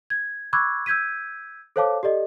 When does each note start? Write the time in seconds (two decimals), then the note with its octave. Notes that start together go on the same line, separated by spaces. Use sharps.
0.10 G#6
0.53 B5 C#6 D6 E6 F#6 G#6
0.86 E6 G6 G#6 B6 D#7
1.76 A4 C5 C#5 F5 A5 D6
2.03 G4 A4 D5 D#5